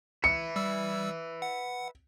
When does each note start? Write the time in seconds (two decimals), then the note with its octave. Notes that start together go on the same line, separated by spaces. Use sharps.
0.24 B4 E5 C#7
0.56 G3 E6
1.42 F#5